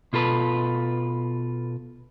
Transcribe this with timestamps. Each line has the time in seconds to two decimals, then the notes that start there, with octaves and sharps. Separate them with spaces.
0.13 B2 F4 A4 B4